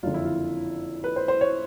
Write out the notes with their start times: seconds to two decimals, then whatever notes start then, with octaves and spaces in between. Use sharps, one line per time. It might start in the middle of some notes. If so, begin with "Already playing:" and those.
0.03 F#1 F2 D3 F4
0.14 E4
0.25 F4
1.04 B4
1.16 C5
1.28 C5
1.41 C#5